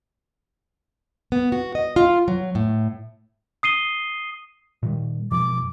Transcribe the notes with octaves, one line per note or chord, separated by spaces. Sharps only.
B3
F#4
D#5
F4
F#3
A2
D#6 C7 D#7 G7
A#2 D#3 G3
F#2 B2 F3 D6